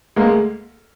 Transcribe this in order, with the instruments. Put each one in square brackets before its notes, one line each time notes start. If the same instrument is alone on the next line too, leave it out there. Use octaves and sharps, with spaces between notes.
[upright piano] D2 G#3 A#3